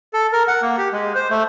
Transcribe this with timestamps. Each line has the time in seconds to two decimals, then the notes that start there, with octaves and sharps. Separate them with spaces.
0.13 A4
0.33 A#4
0.48 F#5
0.62 A#3
0.78 G4
0.92 G#3
1.15 C5
1.30 A3